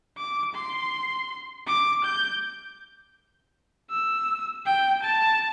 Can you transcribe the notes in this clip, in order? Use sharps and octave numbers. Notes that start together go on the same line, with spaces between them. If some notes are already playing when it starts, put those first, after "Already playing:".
D6
C6
D6
G6
E6
G5
A5